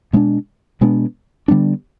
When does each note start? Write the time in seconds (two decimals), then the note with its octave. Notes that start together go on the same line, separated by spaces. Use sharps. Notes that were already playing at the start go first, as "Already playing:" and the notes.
0.13 B2 G#3 B3 D4
0.81 B2 G#3 B3 D4
1.48 D3 G3 B3 D4